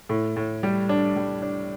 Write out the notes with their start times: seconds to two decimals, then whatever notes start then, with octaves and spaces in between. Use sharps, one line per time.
0.09 A2
0.36 A2
0.63 G3
0.89 D4
1.16 G3
1.42 D4